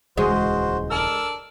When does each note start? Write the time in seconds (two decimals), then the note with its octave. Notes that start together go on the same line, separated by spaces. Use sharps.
0.18 D#1 C#2 E3 G#3 F#4 C5
0.90 D4 A4 A#4 E6